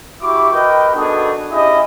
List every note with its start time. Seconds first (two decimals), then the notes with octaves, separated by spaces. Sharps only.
0.22 E4 F#4 G4 C#6 D6
0.52 A#4 B4 D#5 G5
0.95 B3 D4 D#4 F#4 G#4 A4
1.52 C#4 E4 G4 G#4 D#5